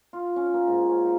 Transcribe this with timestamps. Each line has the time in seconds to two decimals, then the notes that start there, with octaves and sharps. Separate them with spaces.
0.13 F4
0.36 C#4
0.54 A#3
0.67 G#2
0.89 C#4
1.05 D#4